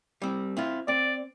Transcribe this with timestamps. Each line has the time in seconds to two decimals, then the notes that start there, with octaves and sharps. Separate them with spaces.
0.22 G3 C4
0.57 C4 E4 F4
0.88 C4 D5